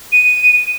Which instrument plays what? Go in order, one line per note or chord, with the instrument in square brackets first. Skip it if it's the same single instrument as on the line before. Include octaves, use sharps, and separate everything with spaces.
[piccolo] D#7